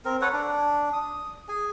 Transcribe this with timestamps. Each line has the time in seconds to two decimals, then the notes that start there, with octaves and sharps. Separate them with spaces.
0.05 C4 A#4
0.21 A4 B4 C#5 F#5
0.33 D4
0.93 D#6
1.49 G#4 G#5